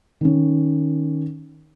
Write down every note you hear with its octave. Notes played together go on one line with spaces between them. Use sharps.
D#3 C#4